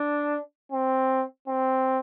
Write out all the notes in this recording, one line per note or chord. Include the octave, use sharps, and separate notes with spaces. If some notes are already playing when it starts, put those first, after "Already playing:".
Already playing: D4
C4
C4